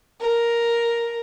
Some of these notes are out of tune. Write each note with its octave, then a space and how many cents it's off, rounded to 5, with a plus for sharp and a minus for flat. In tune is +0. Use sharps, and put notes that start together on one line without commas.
A#4 +5